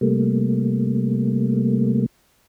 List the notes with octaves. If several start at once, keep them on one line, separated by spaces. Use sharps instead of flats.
C3 G3 A3 A#3